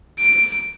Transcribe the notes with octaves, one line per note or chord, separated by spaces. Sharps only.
D7